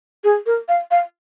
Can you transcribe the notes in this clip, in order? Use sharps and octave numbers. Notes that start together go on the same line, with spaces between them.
G#4
A#4
F5
F5